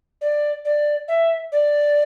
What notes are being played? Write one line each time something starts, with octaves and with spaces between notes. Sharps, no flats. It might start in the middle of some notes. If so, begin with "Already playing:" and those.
D5
D5
E5
D5